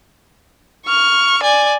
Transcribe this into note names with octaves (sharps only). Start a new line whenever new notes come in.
C#6 F6
D5 G#5